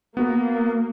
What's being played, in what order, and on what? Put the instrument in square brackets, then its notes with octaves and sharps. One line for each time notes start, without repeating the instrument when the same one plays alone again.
[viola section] A#3 [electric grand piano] B3 F#4 A#4